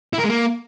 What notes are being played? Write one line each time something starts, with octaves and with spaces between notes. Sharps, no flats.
E4
A#4
G#3
A#3